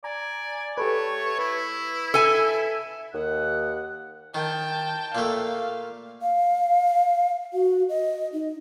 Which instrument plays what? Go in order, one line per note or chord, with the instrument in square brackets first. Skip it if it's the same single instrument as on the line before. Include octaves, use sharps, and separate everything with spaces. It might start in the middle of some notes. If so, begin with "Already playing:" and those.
[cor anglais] D5 [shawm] G#5 [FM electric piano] A#5
[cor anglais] A3 [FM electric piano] G4 A4 B4 [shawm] C#5
[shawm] E4 [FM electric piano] B4
[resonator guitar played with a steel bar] A4 G#5 [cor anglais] E5
[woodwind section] D#2 F#5
[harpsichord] D#3 [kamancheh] G5 A5
[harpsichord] A#2 A3 [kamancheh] F5
[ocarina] F5
F#4
D#5
D#4